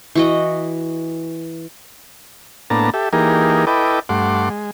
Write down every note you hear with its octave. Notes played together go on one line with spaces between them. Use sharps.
E3 F#4 D#5
A2 A#3 B3 D4 A5 A#5
G4 A4 E5
E3 A#3 D#4 G4 G#4 A#4
E4 A4 B4 D#5 G5 D6
G2 A3 F#5 C6 D6
G#3